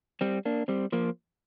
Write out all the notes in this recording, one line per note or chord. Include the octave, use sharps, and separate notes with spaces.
G3 C4
A#3 D4
G3 C4
F3 A#3